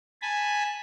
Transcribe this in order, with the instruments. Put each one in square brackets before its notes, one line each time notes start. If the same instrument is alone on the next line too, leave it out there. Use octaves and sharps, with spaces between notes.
[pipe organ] G#5 A5 B5